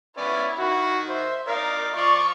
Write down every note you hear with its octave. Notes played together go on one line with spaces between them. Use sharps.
B3 C#4 E4 D5
D#3 F#4
C5 E5
D#4 A#4 D5 F5
F3 F4 D5 C#6